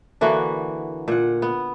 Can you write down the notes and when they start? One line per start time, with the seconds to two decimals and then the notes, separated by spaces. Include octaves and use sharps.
0.21 D3 E3 A#3 F#4
1.08 A#2 F#5
1.42 B3